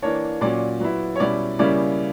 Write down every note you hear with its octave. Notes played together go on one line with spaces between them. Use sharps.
E3 A#3 D4 C#5
A#2 F#3 C#4 D5
F#3 B3 E4
C#5
B2 G3 C#4 E4 D5
C#3 G3 A#3 C#4 E4 D5